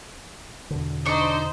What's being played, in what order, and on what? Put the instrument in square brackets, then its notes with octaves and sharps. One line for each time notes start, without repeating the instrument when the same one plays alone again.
[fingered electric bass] E2 B2 D3
[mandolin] D4 C#6 [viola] D#4 C5